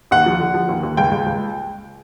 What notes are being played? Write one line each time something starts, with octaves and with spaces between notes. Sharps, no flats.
D#2 F#5
F3
D3
F3
D#2
D#2
C#2 G5
C#2
C#2